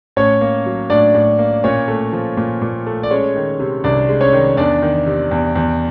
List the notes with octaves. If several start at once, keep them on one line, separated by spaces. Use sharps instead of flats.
A2 C#4 C#5
A#3
F#3
A2 D4 D5
A2
A#3
A#2 C#4 C#5
A3
F3
A#2
A#2
A3
D5
G#3 C#4 C#5
D#3
C3
C2 D4 D5
G#3
C#4 C#5
D#3
E2 D4 D5
D#3
C3
E2
E2